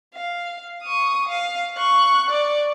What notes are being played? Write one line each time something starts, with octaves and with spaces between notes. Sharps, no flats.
F5
C#6 D#6
F5
C#6 F#6
D5